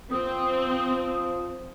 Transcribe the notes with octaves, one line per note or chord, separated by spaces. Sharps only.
F3 C4 D#6